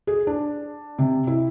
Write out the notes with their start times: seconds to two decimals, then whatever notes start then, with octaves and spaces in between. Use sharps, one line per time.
0.07 G#4
0.27 D4
0.99 C3
1.27 E4